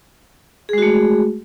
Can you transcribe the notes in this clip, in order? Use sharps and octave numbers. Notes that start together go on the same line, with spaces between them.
G#3 A3 F#4 G#4